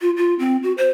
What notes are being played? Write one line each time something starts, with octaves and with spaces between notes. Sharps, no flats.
F4
F4
C4
F#4
C5